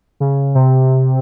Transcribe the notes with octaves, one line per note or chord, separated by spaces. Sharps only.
C#3
C3